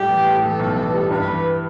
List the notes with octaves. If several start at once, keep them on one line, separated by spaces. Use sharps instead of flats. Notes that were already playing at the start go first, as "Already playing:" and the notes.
Already playing: A2 G3 G4
E3
A2
E3 A4
B1
E3
G3
G2 B4
E3